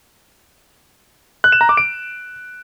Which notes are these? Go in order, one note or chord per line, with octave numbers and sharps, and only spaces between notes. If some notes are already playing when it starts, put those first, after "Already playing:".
F#6
E7
A#5
D6
D7